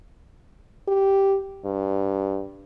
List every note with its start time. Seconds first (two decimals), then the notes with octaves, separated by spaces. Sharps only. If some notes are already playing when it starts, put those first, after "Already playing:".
0.88 G4
1.65 G2